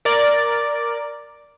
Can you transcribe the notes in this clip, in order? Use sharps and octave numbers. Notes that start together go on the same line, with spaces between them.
A#4 D5